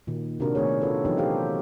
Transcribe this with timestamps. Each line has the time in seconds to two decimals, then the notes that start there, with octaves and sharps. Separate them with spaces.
0.07 A#2 D#3
0.40 C3 D4 F#4 A#4
0.55 D#3 A3 B3 D4 G#4 C#5
0.81 C#4 F4 F#4 A4 B4
1.05 E3 F#3 B3 D#4 G4
1.18 F#4 G4 A4 C5 F5